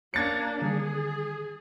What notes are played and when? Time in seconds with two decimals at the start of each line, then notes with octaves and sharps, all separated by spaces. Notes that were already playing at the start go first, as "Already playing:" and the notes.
0.14 A#3 D4 C#5 F#6 G#6 A6 C#7
0.62 D3 D#3 G3 G#4